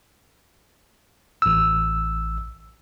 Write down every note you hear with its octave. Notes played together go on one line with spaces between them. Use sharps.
A1 E6